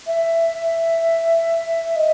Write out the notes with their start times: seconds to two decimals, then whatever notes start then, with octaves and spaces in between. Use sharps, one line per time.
0.06 E5
1.96 D#5